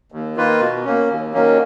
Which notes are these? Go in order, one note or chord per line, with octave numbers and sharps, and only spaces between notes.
D#2
D#3 A#3 F4 B4
B2
A#3 C#4
D#2
D#3 F#3 A#3 C#4